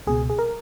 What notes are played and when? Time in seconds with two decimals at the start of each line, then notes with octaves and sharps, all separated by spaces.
0.07 C#2 B2 G#4
0.30 G#4
0.39 A#4